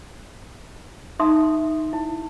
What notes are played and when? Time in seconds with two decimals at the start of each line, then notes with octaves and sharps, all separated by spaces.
1.19 D#4 E5 C6 D#6
1.93 E4